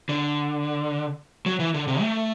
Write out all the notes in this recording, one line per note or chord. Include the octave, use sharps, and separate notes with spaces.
D3
F#3
E3
D3
C3
A3